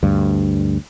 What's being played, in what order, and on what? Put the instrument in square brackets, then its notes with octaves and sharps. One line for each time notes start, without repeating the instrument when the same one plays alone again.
[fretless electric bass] D2 G2